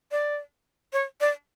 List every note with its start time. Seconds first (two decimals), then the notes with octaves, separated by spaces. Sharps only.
0.12 D5
0.93 C#5
1.21 D5